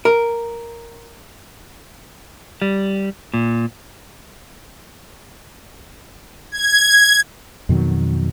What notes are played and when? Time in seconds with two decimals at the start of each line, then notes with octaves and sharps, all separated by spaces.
0.05 A#4
2.62 G3
3.34 A#2
6.51 G#6
7.69 F2 B2 D#3 F#3